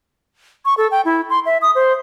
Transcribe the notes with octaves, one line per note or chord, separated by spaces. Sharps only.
C#6
A4
G5
E4
C6
E5
D#6
C5